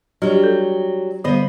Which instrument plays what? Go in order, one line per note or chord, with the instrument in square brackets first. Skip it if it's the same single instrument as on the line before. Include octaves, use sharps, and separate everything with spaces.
[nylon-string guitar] F#3 G3 [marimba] D4 G4 D#5
[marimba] A4
[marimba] D3 G3 [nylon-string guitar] B3 C5 D#5